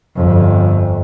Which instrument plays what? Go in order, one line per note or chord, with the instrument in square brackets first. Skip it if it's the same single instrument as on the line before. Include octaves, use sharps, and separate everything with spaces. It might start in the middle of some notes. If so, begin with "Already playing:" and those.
[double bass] G1 F2